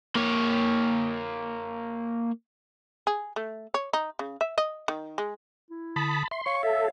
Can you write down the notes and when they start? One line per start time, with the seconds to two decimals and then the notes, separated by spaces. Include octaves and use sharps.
0.16 A#3 C#5
3.07 G#4
3.36 A3
3.74 C#5
3.93 D#4
4.19 C#3
4.41 E5
4.58 D#5
4.88 D#3
5.18 G#3
5.71 E4
5.96 D3 A5 B5 D#6 B6
6.31 E5 C6
6.46 C#5 F5 C#6
6.63 A4 E5